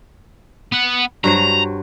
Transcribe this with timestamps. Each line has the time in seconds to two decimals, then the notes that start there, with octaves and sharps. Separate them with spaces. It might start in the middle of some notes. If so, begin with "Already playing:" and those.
0.72 B3 F#5
1.24 G2 F#3 C5 A#5